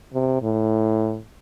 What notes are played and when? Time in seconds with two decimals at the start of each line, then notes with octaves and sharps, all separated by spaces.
0.14 C3
0.42 A2